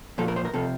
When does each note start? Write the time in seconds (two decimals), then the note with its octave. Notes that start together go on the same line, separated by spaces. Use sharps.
0.18 A#2 F3 A4
0.28 A#4
0.36 C5
0.45 A#4
0.54 C3 F3 A4